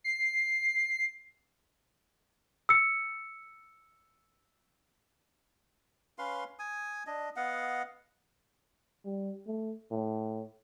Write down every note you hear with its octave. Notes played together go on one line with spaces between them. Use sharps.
C7
E6 C#7
C#4 B4 F5 C6
G#5 D#6
D4 D#5
B3 D#5 F5 F#5
G3
A3
A2